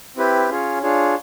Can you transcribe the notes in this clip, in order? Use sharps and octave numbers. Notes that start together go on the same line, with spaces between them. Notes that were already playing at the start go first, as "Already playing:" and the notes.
C4 E4 G4 B4
C#4 F4 G#4 C#5
D4 F4 G#4 C#5